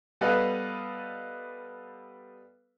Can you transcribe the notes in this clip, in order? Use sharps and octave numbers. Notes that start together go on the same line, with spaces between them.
G3 B3 A4 B4 D#5 F5